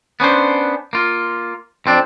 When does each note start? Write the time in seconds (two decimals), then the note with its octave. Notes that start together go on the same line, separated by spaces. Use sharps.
0.20 B3 C#4 D4 C5
0.93 A#3 F4
1.86 F2 C4 D4